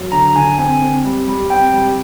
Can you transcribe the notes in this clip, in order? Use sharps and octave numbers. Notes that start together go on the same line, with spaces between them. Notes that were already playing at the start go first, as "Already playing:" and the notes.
Already playing: F#3
D3 A#5
D3 G#5
C4 G#5
C4
G3
G3
C4 G5
G3